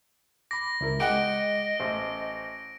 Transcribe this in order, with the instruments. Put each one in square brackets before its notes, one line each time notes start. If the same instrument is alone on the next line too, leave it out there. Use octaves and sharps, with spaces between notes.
[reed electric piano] B5 D6 [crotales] A#6
[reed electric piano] C#2 E4 A#4
[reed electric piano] G#3 D6 [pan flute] D#5 [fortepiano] F#5 G5 [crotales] D7
[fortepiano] A1 [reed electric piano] C5